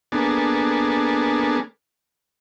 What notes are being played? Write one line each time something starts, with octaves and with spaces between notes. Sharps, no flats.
A#3 B3 D4 G#4 A4